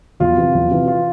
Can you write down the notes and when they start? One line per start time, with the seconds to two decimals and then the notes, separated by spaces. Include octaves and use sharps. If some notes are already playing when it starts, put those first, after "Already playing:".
0.20 E2 F4
0.37 C3 E3
0.54 E2
0.71 C3 E3
0.88 F4